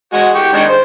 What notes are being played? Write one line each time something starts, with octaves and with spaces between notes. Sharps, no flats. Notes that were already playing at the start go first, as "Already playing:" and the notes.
G#3 F#4
G4 C#6
D#3 G#3 D4
C5